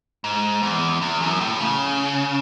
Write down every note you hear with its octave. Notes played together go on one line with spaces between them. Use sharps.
G#2
E2
E2
F#2
A2
C#3